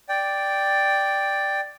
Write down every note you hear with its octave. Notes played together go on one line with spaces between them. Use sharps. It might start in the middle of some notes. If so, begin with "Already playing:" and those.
D5 G5